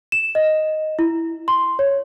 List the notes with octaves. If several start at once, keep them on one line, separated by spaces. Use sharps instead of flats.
E7
D#5
E4
C6
C#5